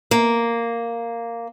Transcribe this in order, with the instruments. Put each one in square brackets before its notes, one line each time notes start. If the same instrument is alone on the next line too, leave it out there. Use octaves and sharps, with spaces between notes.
[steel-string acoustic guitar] A#3